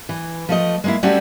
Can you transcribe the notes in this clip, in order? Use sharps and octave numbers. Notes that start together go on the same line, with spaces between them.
E3
F3 A3 D#5
G#3 A#3 E4
G3 A3 C4 C#4 F#4